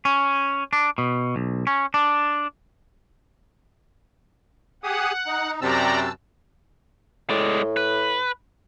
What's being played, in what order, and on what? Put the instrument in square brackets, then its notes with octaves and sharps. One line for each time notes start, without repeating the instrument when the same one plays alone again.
[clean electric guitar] C#4
D4
B2
B1
C#4
D4
[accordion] G4 G#4 D#6 [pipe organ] F#5
[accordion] D#4
[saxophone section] F#2 C3 [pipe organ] G4 D5 A#5 [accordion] A5 E6
[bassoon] A2 [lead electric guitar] G#3 D5
[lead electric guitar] B4